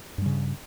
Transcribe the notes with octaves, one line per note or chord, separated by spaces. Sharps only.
G2 C#3 G3